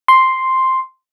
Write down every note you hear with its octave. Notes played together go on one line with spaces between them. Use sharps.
C6